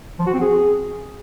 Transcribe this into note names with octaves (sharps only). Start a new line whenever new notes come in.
F3
F#4
C4
G#4